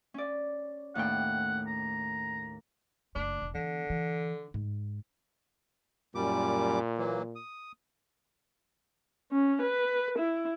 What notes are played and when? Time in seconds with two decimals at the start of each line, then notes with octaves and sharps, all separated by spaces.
0.14 C#4 D5
0.95 D#2 A2 F#5 G5
1.67 A#5
3.15 F#1 A3 D4
3.42 E1
3.55 D3 E3 B3
3.90 E3
4.54 G#2
6.15 F#2 A#2 G3 D6
6.98 E3 F#3 A#3
7.36 D#6
9.32 C#4
9.62 B4
10.19 E4